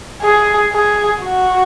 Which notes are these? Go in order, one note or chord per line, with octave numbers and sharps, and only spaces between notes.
G#4
G#4
F#4